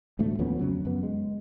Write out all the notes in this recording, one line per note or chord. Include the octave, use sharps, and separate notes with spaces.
E1 D2 A2 A3
D#2 F3 B3 C#4
F2 C#3 F#3
F#2 B3
G#3